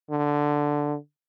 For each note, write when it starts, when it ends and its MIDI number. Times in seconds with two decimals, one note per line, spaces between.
0.10 0.96 50